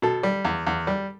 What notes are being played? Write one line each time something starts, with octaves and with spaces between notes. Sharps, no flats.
B2 A4
G3
E2
E2
G3